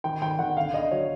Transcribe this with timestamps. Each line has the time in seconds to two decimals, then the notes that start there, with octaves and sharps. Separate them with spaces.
0.04 D#3 G5
0.22 D#3 G5
0.39 D#3 F#5
0.56 D3 F5
0.74 D3 D#5
0.91 F#3 C#5